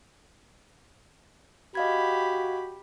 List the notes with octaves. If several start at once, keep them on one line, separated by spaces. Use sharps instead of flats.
F#4 G4 D#5 F5 B5 G#6